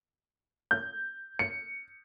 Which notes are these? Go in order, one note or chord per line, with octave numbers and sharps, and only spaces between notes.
G6
C#7